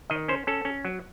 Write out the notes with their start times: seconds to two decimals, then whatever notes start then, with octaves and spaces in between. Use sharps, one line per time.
0.10 D#3 D#5
0.28 C#4 C5
0.47 C#4 A4
0.65 C#4
0.85 F#3